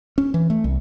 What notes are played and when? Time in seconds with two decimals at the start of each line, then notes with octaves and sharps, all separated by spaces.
0.18 C#4
0.34 E3
0.50 A3
0.64 C2